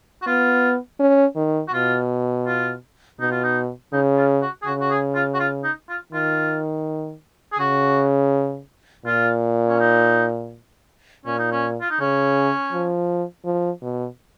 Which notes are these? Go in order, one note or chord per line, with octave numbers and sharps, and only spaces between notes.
F#4
B3 F4
C#4
D#3
F#4
B2 F4
F4
B2 D#4
F4
D#4
C#3 D#4
F4
F#4
G#4
C#3 F#4
F#4
G#4
F4
F#4
F4
D#4
F4
D#3 F4
G#4
C#3 F#4
A#2 F4
C#4
D#4
A#2 C#4
D#4
C#4
F4
D#4
C#3 C#4
F3
F3
B2